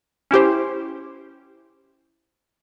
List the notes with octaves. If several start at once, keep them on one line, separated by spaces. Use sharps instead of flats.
C#4 E4 G4 C5